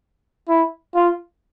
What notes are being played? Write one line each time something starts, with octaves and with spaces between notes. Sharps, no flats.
E4
F4